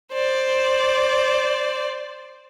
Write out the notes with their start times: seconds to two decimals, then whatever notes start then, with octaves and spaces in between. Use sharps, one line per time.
0.13 C5 D5